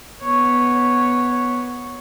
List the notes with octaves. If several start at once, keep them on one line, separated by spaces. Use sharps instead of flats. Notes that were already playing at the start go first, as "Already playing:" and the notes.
B3 C#5